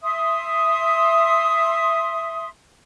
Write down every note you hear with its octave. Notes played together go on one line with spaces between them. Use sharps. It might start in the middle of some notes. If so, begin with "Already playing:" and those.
E5 C6 D#6